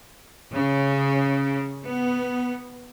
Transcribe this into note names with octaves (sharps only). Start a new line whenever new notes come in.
C#3
B3